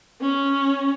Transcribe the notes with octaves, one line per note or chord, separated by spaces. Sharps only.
C#4